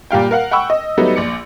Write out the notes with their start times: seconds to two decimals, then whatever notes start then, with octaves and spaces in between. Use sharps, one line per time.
0.11 A#2 G3 F5 G5
0.31 A#4 F5 F#5
0.51 F#5 G5 B5 C#6 E6
0.70 D#5
0.97 F#3 G3 A3 B3 D#4
1.16 A#1 D5 C#7